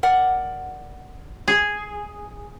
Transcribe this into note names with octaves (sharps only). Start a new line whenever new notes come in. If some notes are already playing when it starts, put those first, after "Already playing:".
A#4 D5 F#5
G#4